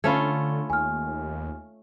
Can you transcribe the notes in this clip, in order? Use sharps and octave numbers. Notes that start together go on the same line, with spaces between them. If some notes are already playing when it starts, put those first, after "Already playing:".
D3 A3 C#4 F4 B5 G#6
D#2 G#5 F6